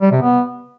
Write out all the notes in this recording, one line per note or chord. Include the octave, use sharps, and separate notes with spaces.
G3
C3
B3